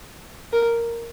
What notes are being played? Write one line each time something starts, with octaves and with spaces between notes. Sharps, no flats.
A#4